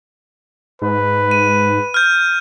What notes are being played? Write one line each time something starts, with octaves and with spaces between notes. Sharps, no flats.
G#2 B4
D#7
F6 G6